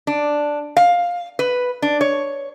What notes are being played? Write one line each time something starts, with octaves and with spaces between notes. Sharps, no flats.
D4
F5
B4
D4
C#5